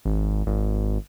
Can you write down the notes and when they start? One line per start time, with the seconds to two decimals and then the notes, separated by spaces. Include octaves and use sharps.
0.05 G#1
0.47 G#1